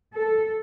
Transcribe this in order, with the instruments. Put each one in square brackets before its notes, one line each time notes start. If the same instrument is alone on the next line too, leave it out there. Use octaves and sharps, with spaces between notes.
[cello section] A4